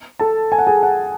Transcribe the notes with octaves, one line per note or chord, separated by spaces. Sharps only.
A4 A5
G#5
F#5
G#4 G#5
F#5